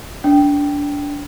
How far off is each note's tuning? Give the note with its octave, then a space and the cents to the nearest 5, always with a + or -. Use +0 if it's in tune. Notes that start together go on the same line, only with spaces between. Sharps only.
D4 -20 G5 +0